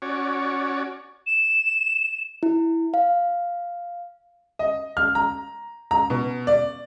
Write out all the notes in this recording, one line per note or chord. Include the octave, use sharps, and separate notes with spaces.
C#4 F#4 C#5 D5
E7
E4
F5
D#5
F6
A#5
A#5
B2
D5